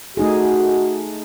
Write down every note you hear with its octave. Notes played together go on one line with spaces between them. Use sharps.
A3 D#4 F#4 G#4